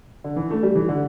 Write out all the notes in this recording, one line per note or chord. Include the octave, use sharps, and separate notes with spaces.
D3
E3
A3
G3
E3
D3